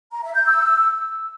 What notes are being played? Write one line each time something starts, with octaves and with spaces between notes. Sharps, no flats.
A#5
E5
G6
E6